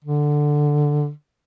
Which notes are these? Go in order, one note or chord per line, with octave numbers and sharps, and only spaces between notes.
D3